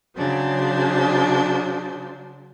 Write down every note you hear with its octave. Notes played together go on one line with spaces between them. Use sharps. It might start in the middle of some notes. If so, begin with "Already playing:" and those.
C#3 F#3 D4 C5